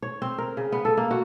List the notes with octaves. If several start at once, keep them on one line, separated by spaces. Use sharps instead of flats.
C#5
C4
A#4
C#3
B3
A4
A#3
F#4